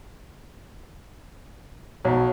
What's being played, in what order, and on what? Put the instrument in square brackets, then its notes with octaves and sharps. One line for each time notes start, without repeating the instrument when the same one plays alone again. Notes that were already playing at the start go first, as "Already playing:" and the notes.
[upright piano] B1 [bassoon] F#3